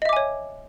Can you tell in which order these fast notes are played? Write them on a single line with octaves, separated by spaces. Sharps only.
D#5 E5 D6 G#5 C#5